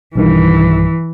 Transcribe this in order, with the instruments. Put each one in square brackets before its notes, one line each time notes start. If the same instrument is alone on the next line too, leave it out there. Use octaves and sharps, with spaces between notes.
[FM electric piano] B1 G2 D#3 [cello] E3